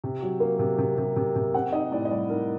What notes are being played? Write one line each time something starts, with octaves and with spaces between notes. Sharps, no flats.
C3
F#3
A#3
C3
C3
C3
C3
C3
C4 F#5
D#4 D#5
A2 D5
D#5
G3 D5
D#4 A#4